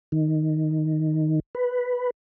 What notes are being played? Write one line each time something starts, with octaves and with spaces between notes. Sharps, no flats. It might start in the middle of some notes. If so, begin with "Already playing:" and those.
D#3
B4